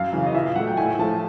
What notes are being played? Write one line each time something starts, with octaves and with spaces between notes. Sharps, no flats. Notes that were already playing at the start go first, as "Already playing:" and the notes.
Already playing: F#2 F5
C#3 E3
D#5
A#2 E5
F5
F#3 A3 F#5
G5
A2 G#5
F3 A3 A5